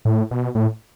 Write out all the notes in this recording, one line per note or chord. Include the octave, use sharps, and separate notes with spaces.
A2
B2
A2